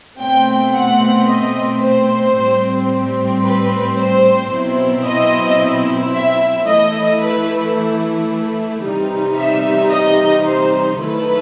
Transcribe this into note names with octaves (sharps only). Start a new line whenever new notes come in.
B2 A3 C4 G5
F#5
D#5
C5
A2 G3 C4
B4
C5
B2 F#3 C4 E4
D#5
E5
E3 A3 E4 D#5
B4
C3 E3 G3 D#4
E5
D#5
C5
D#3 F#3 A3 E4 B4